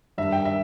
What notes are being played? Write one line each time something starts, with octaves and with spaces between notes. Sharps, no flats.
G2 E5
G5
E5